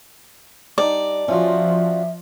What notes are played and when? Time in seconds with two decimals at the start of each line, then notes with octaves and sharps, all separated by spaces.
0.78 G3 D4 D#4 D5
1.28 F3 C#4 F4 F#4 E5